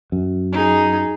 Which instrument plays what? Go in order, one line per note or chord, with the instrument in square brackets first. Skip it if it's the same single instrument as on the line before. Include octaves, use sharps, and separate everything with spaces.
[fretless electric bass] F#2
[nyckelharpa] D#4 G#4